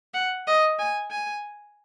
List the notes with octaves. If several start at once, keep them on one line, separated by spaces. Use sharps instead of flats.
F#5
D#5
G#5
G#5